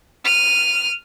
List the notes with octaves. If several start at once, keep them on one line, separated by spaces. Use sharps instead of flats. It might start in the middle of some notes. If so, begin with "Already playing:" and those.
F6 D#7